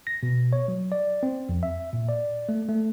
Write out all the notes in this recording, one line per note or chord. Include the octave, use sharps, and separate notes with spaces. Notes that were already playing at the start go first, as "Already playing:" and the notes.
A#6
B2
C#5
F#3
D5
C4
F2
E5
A#2
D5
A3
A3